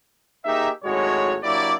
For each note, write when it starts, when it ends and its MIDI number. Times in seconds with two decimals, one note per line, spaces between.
0.45 0.69 58
0.45 0.69 63
0.45 0.69 67
0.45 0.69 68
0.45 0.69 76
0.84 1.37 32
0.84 1.37 45
0.84 1.37 56
0.84 1.37 66
0.84 1.37 73
1.43 1.74 54
1.43 1.74 58
1.43 1.74 62
1.43 1.74 64
1.43 1.74 67
1.43 1.74 74